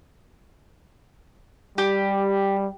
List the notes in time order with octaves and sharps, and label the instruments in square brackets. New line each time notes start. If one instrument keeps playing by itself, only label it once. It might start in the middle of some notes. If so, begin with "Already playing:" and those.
[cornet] G3 [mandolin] G4